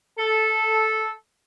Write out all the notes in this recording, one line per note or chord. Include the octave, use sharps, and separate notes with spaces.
A4